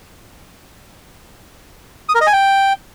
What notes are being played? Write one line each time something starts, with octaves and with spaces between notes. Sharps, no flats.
D#6
A#4
D#5
G#5
G5